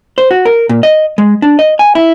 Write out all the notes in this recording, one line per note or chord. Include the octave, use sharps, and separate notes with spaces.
C5
F#4
A#4
A#2
D#5
G#3
D4
D#5
G#5
E4